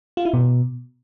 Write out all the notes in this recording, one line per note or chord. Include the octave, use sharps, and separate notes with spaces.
F4
E4
B2